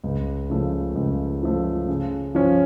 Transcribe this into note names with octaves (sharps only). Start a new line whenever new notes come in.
C#2
C#3 F3 A3
C#2
C#3 F3 A3
C#3
F3 C#4